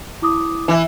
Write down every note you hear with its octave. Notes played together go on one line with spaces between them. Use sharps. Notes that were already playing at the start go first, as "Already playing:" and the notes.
E4 D6 D#6
E3